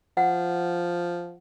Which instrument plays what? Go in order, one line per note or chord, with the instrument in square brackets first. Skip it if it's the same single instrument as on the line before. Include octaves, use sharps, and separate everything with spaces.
[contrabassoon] F3 [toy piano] F#5